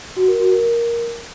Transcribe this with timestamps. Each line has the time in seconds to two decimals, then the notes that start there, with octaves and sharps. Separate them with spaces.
0.17 F#4
0.28 A#4
0.40 F#4
0.52 A#4